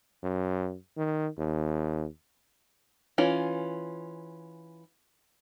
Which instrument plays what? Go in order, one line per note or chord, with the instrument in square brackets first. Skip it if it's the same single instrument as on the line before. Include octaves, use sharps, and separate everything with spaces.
[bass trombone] F#2
D#3
D#2
[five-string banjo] E3 C#4 F4